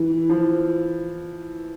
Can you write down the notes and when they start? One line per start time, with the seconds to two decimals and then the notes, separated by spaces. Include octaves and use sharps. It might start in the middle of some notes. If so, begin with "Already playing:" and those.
Already playing: E3
0.29 F3